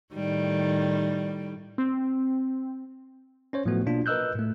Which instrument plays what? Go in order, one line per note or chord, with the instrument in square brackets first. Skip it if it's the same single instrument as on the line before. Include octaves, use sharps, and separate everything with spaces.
[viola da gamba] A2 D#3 G3
[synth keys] C4
[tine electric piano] C#4 C5 C#5
A2 F3 F#3 A3 B3 F#4
B2 A#3 D4 F4
A#4 B4 D#5 E6 F#6 G6
A2 A3